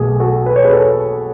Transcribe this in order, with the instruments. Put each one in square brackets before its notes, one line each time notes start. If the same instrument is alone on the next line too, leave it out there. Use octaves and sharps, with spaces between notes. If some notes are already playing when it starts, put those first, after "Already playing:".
Already playing: [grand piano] B1 B2 A3 G#4
F#4 A4
B4
C#5
G#4 B4
A4 C#5